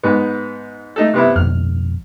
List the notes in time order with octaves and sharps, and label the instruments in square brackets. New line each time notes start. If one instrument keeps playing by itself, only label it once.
[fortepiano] G#2 B3
A3 D#4 A4
C3 B3 E4
[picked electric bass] B1 F2 [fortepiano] F6